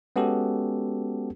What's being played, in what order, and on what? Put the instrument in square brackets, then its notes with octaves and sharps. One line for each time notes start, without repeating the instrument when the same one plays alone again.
[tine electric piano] G#3 B3 C#4 F#4 G4 A4